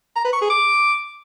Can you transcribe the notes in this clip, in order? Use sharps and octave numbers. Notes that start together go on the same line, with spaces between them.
A#5
B4
C#6
G#4
D6